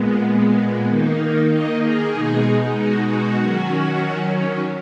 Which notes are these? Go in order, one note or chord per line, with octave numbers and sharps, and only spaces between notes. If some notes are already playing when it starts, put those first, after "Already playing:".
Already playing: A#2 G#3 B3
D#3 A#3 D#4
D#5
G#4
B2 G#3 D#4
F#4
F#4
D#3 F#3 C#4